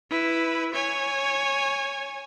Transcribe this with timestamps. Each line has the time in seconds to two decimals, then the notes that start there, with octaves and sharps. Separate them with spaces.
0.11 E4 B4
0.75 C#5 G#5